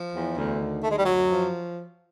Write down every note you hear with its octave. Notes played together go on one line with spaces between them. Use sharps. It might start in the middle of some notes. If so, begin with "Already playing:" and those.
Already playing: F3
E2
D2
D#3
D2 A3
G#3
G3
F#2 F#3
F3